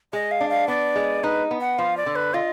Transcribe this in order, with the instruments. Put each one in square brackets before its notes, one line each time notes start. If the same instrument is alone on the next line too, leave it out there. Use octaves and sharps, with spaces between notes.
[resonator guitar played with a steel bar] G#3 [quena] D#5
[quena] F5
[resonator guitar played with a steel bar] D4
[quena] F5
[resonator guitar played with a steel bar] B3 [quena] D5
[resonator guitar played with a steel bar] G#3
[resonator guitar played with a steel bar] D#4 [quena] B4
[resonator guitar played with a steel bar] B3
[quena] F#5
[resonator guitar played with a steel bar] F3 [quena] F5
[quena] D5
[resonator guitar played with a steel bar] D3
[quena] B4
[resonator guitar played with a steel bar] F4 [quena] D#5